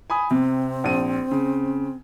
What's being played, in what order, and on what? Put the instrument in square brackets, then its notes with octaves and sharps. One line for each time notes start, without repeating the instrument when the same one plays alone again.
[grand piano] G#5 B5 D#6
[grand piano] C3 [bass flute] C4
[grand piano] A#1 D#7
C#3